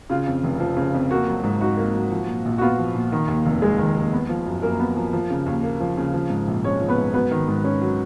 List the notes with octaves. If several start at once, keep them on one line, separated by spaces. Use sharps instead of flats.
C#3 F4
F2
F1
F3
C#3
F2
A#3 F#4
F#3
G#2
D#4 F#4
A#3
F#3
F3
A#2
A#1
F#4
B3 F4
F3
A#2
D#3
D#2
F1
G#3 G#4
D#3
D#2
B3
F3
F#2
F#2 A#3 A#4
B3
F3
F3
C#3
D#2
A#3
F3
C#3
F3
G#2
A#1
G#3 C#4 C#5
F3
B3 B4
G#2
F#3 B3 B4
D#3
G#2
C#4
F#3